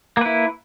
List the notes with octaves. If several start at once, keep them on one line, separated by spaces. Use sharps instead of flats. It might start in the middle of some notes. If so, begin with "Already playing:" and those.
A#3 E4 B4